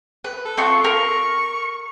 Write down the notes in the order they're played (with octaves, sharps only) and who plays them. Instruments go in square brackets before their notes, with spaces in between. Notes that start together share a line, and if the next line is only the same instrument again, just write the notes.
[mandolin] B4
[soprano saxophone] A4
[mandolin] C4 F4 C#6
[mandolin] A#4 [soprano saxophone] C#6